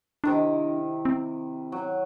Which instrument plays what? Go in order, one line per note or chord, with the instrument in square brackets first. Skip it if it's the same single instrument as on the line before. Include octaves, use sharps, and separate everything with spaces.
[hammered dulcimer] C3 D#3 E4 [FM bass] D4
[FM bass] C4
[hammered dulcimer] F#3